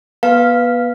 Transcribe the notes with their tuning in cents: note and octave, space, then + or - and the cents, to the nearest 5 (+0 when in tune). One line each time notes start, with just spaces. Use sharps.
B3 -30 B4 +0 F5 +0